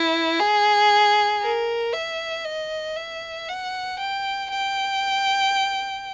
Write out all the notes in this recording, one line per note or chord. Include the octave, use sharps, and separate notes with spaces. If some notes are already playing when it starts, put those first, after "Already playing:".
Already playing: E4
G#4
A#4
E5
D#5
E5
F#5
G5
G5